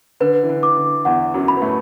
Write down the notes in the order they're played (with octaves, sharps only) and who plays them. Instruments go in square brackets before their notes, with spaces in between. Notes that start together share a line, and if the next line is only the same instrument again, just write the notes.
[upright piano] D3 [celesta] B4
[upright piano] E3
D3
[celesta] D6
[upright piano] D3
[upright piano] E2 E3 [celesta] F#5
[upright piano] F#2 F#3
[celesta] B5
[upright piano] B3
A2 A3